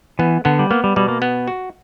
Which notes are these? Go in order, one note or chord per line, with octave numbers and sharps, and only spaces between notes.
E3 B3
D3 B3
G3
A#3 B3
G3
B2 G3
A#3
B3
F#4